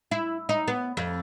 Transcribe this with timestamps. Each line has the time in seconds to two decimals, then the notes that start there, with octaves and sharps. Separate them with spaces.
0.11 E4
0.49 D#4
0.68 B3
0.97 F2